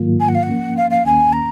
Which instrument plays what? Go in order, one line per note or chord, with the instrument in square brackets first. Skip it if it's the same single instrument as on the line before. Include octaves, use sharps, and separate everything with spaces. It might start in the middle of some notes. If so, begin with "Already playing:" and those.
Already playing: [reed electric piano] G#2 D#3 F#3 A#3 F4
[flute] G#5
F#5
F5
F#5
[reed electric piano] F3 A#3 C#4
[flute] F5
F5
[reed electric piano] D#2 D#3 A#3 C#4 [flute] G#5
[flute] A#5